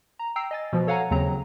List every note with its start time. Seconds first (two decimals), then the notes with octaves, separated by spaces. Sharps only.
0.19 A#5
0.36 G5 A#5 E6 C7
0.51 D#5 G#5 A6
0.73 B2 F3
0.87 A4 C#5 F5 F#5 G#5 A#5
1.11 D#2 C#3 F#3 C4 A#5